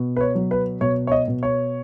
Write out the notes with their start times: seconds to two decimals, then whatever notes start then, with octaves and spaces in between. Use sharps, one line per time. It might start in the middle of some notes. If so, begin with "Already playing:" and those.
Already playing: B2
0.16 B4
0.21 C#5
0.35 F#3
0.51 B4
0.81 B2 C#5
1.07 C#5
1.12 D#5
1.28 B2
1.43 C#5